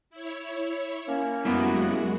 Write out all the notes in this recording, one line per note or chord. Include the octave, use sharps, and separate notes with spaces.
E4 C#5
A#3 C#4
F#2 G3 G#3 B3 E4 F#4 A#4